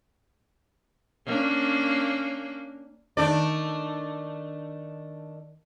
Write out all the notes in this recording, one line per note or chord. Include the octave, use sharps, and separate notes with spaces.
A#3 C#4 D4
D#3 A3 D4 D5